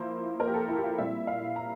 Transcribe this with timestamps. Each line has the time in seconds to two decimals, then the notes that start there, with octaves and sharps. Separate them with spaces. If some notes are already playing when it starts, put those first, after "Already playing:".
Already playing: F3 A#3 E4 C5
0.40 A#4
0.47 G4
0.54 A4
0.68 E4
0.76 G4
0.83 F4
0.98 A#2 G3 C4 E4 E5
1.27 F5
1.56 A#5